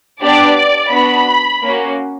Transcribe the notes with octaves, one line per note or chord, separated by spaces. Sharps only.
B3 D4 G4 D5
B3 D4 F#4 B5
A#3 C#4 F#4